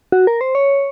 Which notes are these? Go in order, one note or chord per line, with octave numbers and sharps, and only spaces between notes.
F#4
A#4
C5
C#5